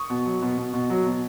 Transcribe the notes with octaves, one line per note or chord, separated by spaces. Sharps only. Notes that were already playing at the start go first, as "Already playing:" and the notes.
Already playing: C#6 D#6
B2
F#3
B2
B2
B2
F#3
B2